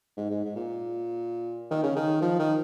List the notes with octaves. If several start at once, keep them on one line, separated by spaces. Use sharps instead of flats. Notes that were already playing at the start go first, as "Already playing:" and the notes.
G#2
G#2
G#2
A#2
D#3
C#3
D#3
F3
D#3